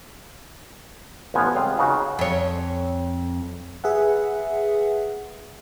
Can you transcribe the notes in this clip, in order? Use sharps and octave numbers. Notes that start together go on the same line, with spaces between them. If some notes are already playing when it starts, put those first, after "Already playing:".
A1 F3 B3 G#5
C#2 G3 C4 F4 F5
C#3 D#4 F#4
F2 C#5
G#4 B4 E5 F#5